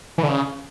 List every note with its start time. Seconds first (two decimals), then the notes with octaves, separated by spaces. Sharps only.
0.18 E3
0.23 D3
0.28 C#3